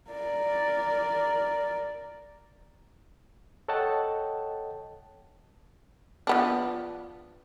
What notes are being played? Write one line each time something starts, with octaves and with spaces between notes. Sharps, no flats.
A#4 D5
A4 C#5 D#5 F#5 G5 A5
F3 B3 D4